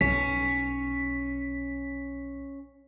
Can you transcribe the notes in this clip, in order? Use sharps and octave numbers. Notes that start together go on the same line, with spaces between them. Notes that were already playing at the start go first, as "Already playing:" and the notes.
B1 C#4 B6